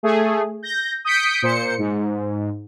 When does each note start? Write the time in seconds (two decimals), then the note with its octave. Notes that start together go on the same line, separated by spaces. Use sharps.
0.03 A3 G#4
0.63 G6 A#6
1.05 D#6 G6 B6 C#7 D7
1.42 A#2 C5 C#7
1.78 G#2